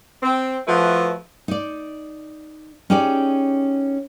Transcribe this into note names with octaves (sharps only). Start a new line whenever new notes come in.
C4
F3 A3 E4 F#4 B4
D#4 D5
C#4 D#4 G4 G#4 D5